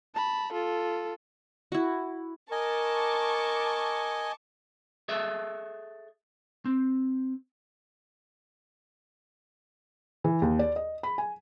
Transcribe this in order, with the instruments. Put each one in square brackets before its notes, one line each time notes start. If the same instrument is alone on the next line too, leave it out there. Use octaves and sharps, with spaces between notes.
[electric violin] A5 B5
F4 A4
[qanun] E4 F#4
[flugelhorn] A#4 [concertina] D#5 G#5 [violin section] A5 C#6 D6
[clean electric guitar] G#4 A4 D#5 E5
C4
[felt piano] E3
D#2
D5
D#5
B5
G#5